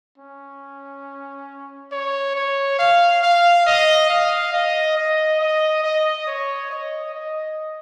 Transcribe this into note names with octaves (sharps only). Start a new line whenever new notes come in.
C#4
C#5
C#5
F5
F5
D#5
F5
D#5
D#5
D#5
D#5
C#5
D#5
D#5